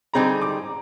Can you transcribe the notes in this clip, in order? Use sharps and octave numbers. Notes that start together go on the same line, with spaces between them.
D3 G3 C4 D#4 G#4 A#5
D6